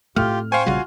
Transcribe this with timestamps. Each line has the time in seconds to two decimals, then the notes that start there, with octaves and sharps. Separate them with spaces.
0.16 A2 A3 C4 F4 G4 F6
0.52 C5 F5 G5 G#5 C#6
0.66 A#1 C#3 G3 F4 F#4